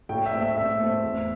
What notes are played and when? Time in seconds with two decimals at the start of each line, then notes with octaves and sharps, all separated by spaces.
0.09 A2 G5
0.26 E5
0.33 A3 C4
0.41 E5
0.56 A2 E5
0.79 A3 C4
1.03 E2